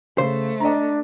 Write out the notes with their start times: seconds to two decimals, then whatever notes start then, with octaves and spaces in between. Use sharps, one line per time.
0.18 C#3 A3 C5
0.60 D4 D#5 A#5